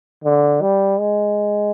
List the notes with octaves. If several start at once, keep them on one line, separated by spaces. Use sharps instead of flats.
D3
G3
G#3